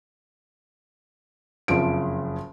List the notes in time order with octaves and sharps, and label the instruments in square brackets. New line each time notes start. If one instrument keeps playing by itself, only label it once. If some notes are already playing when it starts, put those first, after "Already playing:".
[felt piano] F#1 F2 F3 D7